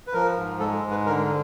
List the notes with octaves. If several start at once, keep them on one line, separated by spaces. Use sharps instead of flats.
B4
F3 A#4
G#2
G#3 A4
G#2
B4
D3 A#4